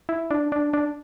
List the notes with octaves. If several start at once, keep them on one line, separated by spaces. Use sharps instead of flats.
E4
D4
D4
D4